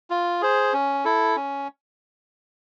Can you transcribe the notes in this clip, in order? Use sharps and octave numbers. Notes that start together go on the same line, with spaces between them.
F4
G#4 C5
C#4
E4 A4
C#4